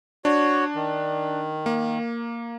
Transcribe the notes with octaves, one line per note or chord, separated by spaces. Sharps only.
D4 F#4 C#5
D#3
A#3